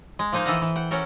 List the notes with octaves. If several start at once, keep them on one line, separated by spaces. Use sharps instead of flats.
G#3
F3 A#3 D#4 C5 F5
E3 A4 D#5 E5 F#5 A#5
E3
F#5 G5
C#4 F#4 A4 A#4